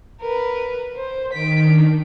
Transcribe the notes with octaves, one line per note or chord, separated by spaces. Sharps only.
A#4 B4
C5
D#3 B6 D7
D4